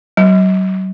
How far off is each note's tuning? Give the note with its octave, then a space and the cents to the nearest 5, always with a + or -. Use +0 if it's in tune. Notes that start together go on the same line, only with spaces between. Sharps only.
F#3 +40